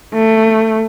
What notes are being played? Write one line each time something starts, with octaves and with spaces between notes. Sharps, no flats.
A3